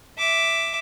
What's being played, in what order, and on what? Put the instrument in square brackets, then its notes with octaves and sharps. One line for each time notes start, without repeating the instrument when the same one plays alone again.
[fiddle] E5 D6